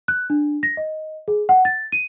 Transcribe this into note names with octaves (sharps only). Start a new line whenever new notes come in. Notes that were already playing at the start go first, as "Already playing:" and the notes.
F#6
D4
A#6
D#5
G#4
F#5
A6
D#7